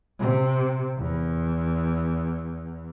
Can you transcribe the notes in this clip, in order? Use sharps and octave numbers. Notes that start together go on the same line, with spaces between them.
C3
E2